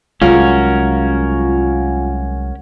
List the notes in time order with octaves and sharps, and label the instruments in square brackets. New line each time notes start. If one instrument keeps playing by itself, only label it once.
[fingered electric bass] C2 F#3 G#3 [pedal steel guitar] C#4 F#4 A#4 [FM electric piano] F4 F5